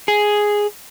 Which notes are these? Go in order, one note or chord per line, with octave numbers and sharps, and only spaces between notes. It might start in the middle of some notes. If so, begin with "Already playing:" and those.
G#4